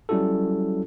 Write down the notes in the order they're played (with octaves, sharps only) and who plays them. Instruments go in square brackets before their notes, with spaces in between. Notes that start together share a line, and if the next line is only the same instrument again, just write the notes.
[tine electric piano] F#3 G3 C#4 E4 F#4 A4